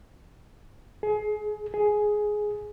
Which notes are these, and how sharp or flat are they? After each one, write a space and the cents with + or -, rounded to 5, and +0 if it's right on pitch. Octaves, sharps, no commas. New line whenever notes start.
G#4 +30
G#4 +10